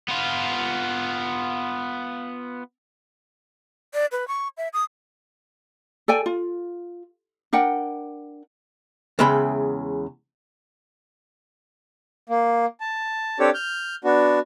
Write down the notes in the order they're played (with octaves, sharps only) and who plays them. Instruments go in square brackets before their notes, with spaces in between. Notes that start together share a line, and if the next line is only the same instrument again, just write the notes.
[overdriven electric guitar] B3 F4
[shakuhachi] D5
B4
C#6
E5
D#6
[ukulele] A4 D5 G5 G#5
F4
D4 A#4 F#5 G5
[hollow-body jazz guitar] E2 C#3 G#3 E5 G5 B5
[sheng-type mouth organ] A#3
A5
C4 D4 G4 A4 C#5
F6 G6
B3 D4 F#4